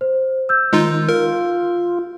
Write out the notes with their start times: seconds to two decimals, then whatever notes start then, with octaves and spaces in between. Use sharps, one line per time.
0.01 C5
0.49 E6 G6
0.73 D#3 G#3 D#4 F4
1.09 F4 A#4